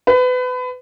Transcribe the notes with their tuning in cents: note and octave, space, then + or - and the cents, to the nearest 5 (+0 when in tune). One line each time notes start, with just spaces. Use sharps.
B4 +30